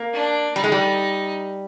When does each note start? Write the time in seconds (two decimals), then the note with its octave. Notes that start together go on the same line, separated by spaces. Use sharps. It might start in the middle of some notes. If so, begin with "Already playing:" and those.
Already playing: A#3
0.13 D4
0.56 G3 D#4
0.64 G#3
0.72 G3